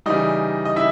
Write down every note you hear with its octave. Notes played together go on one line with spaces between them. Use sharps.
C#3 E3 G3 D#4 D#5
D#5
C#3 E4 E5